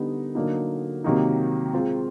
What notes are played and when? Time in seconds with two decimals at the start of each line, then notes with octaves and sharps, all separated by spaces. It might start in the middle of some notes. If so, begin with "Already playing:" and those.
Already playing: D3 G3 B3 D#4 G4
0.35 D3 F#3 A#3 D#4
1.04 C3 D#3 F#3 A#3 D#4
1.74 G#3 C4 F4